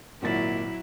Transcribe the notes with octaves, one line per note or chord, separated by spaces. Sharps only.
G#1 A#2 F#3 E4 A6